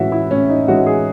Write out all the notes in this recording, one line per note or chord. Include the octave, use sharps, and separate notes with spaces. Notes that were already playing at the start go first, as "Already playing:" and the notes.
Already playing: A2 E3 G#3 C#4 F#4 E5
E4
A2 C#4
D#4
E3 G#3 C#4 F#4
G#4